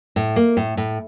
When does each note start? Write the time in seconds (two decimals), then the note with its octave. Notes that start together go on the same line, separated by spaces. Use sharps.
0.16 A2
0.36 A#3
0.57 A2
0.77 A2